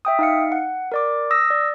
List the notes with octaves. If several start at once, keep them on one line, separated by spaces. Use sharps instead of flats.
E5 G5 D#6
D#4 F5 C#7
F#5
A#4 D5 D6
D#6 E6 A#6
D5